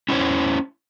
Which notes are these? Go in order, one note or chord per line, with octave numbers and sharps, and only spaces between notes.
C#4 E4 G4 C5 C#5